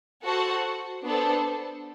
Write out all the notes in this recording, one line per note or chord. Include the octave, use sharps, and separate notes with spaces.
F#4 A4 C5 F#5 A5
B3 D4 A4 C5